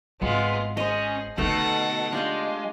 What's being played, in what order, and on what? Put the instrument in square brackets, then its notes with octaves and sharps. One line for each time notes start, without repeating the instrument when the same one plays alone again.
[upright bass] G#1 [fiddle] G#3 F4 [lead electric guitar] B3
[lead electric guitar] C#4 [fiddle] G#4 [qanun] C5 D#5
[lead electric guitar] B2 [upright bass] D3 B3 [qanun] A3 D#4 [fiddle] A4 F#5
[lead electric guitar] G#3 [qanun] D4 G4 F5 [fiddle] F4